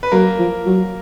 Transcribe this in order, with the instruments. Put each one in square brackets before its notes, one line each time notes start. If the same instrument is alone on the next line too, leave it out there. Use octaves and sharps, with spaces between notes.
[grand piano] B4
[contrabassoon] F#3 [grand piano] A#3 A#4
[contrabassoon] F3
F#3